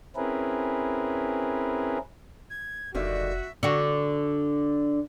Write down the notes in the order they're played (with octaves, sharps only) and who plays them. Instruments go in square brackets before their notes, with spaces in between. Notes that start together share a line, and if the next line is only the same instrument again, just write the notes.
[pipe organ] C4 C#4 E4 G#4 A#4 B4
[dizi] G#6
[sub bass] F1 [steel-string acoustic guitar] G2 D3 D#3 [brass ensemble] F#4 [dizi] E5
[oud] D3 F#4